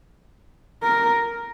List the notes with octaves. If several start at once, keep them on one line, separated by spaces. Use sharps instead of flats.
A#4